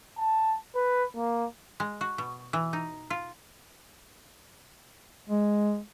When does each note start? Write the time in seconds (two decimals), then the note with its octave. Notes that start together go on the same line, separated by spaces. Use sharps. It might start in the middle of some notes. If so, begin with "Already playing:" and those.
0.18 A5
0.75 B4
1.16 A#3
1.80 G#3
2.01 F#4
2.18 B2
2.53 E3
2.73 D#4
3.10 F4
5.30 G#3